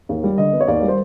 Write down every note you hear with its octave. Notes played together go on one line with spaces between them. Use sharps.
D#2
G3
D3 D#5
B3
C#5
D#2 D5
G3
C5